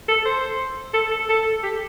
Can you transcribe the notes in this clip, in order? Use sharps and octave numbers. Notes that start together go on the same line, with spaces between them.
A4
C5
A4
A4
A4
G4